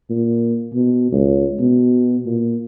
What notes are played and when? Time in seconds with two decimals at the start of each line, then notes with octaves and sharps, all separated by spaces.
0.10 A#2
0.74 B2
1.12 C#2
1.59 B2
2.26 A#2